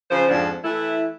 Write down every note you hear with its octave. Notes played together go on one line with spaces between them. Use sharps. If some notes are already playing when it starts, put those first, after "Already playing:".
C#3 F3 C5
F2 G#2 F3 D4
E3 A3 E4